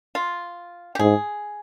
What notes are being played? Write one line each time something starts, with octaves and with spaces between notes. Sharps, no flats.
F4
G4
G#2 G#4